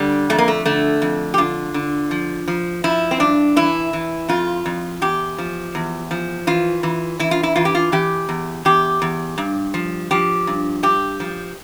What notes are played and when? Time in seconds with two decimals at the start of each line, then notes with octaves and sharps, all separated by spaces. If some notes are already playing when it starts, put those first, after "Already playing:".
Already playing: D3 G3
0.30 F2 A3
0.38 A#3
0.48 A3
0.66 D3 A3
1.02 F2
1.34 G4
1.38 D3 F4
1.74 D3
2.11 F3
2.48 F3
2.84 F3 E4
3.11 C4
3.20 G2 D4
3.56 E3 E4
3.93 E3
4.29 F2 F4
4.66 F2
5.02 E2 G4
5.38 F3
5.75 E2
6.11 F3
6.47 E3 F4
6.83 E3
7.19 E3 E4
7.31 F4
7.43 E4
7.56 E3 F4
7.65 G4
7.75 F4
7.92 E3 G4
8.29 E2
8.65 E2 G4
9.02 E2
9.38 G2
9.74 F3
10.11 F3 G4
10.47 G2
10.83 G2 G4
11.20 F3